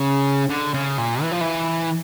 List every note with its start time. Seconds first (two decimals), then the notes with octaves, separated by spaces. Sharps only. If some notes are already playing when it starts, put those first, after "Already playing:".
Already playing: C#3
0.50 D3
0.74 C#3
0.98 A#2
1.22 E3
1.31 F3
1.41 E3